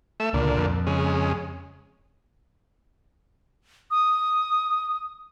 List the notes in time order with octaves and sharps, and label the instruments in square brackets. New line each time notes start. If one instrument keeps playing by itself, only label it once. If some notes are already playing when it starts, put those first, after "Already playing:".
[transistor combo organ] A3 E5
[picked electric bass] C#2 [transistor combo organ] A#2 D3
[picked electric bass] F2
[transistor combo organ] C#3 G#3
[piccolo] D#6